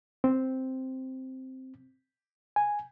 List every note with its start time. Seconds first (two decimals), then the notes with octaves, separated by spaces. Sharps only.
0.24 C4
2.56 G#5